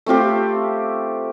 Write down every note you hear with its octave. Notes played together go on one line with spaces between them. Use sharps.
A3 C4 F4 G4